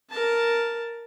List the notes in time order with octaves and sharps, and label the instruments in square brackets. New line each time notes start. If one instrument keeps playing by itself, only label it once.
[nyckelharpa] A#4 A5